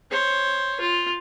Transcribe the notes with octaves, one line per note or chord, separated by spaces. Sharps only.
C5 C#5
F4